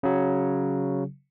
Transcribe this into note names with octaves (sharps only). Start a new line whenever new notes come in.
C#3 F#3